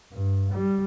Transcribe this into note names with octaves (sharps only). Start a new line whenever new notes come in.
G2
G3